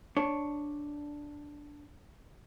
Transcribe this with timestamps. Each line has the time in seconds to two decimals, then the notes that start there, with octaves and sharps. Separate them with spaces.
0.17 D4 C#5